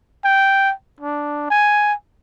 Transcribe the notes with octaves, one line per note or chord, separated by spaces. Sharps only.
G5
D4
G#5